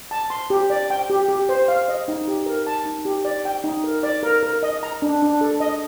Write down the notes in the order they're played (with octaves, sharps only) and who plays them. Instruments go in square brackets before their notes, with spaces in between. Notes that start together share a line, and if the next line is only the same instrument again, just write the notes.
[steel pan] A5
C6
G4
D5
G5
G4
G4
C5
F5
D#5
D#4
G4
A#4
A5
D#4
G4
D5
G5
D#4
A#4
D5
A#4
A#4
D#5
A#5
D4
D4
A4
D#5